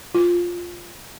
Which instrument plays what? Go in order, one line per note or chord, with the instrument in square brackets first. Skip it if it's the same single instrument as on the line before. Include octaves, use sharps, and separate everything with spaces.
[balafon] F4